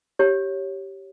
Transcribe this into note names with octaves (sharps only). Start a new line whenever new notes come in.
G4 C#5